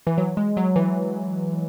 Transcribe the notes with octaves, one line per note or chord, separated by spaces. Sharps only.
E3
F#3
G#3
F#3
E3